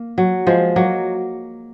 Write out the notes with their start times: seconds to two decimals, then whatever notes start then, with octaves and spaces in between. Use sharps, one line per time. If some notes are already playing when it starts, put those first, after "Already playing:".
Already playing: A#3
0.18 F#3
0.47 F3 G#3
0.76 F#3 A#3